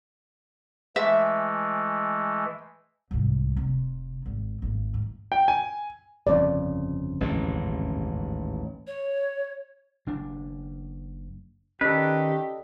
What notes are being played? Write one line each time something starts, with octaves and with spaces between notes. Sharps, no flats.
E3 G#3 A3 E5
C2 G#2
F1 C3
G#1
G#1
D2 G#2
G5
G#5
G1 F2 C#3 D5
A1 D#2 G#2
C#5
F#1 D4
D#3 C#4 G4 A4 B4 D5 D#5